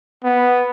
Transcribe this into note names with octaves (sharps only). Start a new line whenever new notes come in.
B3